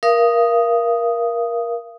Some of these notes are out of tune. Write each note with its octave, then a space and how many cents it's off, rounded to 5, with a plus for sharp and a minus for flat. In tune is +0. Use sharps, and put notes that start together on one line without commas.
A#4 +20 F5 -35 D#6 +0